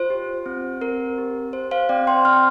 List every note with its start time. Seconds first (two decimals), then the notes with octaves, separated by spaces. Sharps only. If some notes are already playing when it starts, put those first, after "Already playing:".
Already playing: F4 C5
0.10 G4
0.46 C4
0.81 C4 A#4
1.18 G4
1.53 G4 C5
1.71 C5 F5
1.89 C4 D5 G5
2.07 G5 C6
2.25 C4 C6 F6